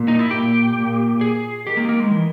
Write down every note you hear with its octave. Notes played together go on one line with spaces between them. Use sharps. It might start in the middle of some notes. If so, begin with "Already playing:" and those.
Already playing: A#2
D#4
E4
A#2 G4
A#2
G#4
D#3 G4
A#3
A#3
G#3
E3